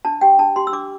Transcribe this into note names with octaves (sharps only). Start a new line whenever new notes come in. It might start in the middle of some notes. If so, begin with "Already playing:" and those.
D4 A5
G4 G5
D4 A5
G4 C6
E6
D4 D6